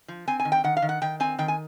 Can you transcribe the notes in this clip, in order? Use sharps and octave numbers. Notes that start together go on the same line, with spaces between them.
F3
C4 G#5
G#5
D#3
G5
D#3 F#5
F5
D#3
F#5
D#3 G5
C4 G#5
D#3 G5
G#5